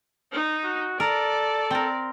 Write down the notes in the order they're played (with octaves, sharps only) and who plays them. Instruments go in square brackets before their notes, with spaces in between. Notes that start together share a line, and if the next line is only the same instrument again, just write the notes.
[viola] D#4
[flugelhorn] F#4
[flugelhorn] A4 [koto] A#4 [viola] D5
[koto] C4 A#4